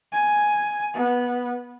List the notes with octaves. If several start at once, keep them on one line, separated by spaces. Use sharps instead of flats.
G#5
B3